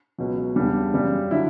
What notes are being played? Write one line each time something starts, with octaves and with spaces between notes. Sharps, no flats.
C#2 B2 F#3
E2 C#3 G3 D4
F#2 C#3 G3
D3 F#3 E4